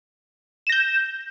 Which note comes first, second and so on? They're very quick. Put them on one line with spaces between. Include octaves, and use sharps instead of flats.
E7 A#6 G6